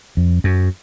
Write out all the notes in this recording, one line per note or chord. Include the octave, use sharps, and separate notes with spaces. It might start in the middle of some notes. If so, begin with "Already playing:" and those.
F2
F#2